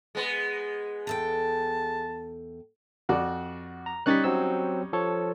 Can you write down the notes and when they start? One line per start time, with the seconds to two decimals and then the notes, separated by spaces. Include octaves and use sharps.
0.15 G#3 B3
1.07 E2 A4 G5 A5
3.09 F2 F#4 D5
3.86 A#5
4.06 G3 C#4 D#4 F#6 A6 B6
4.24 F#3 C4 E6
4.93 F3 A4 C#5